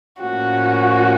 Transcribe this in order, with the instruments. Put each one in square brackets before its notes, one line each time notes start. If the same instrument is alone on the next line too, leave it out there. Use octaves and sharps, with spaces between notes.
[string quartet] A2 F3 A#3 C#4 [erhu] F#4